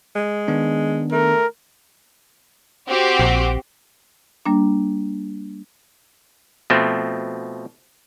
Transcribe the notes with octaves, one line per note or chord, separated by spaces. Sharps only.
G#3
D#3 B3 D4
A3 A#4
C4 F#4 G4
A#1
G3 A#3 D4
B2 F3 A3 C4